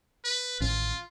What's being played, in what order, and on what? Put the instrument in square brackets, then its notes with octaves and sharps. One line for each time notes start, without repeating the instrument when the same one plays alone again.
[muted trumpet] B4
[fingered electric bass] A1 D#3 C#4 [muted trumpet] F4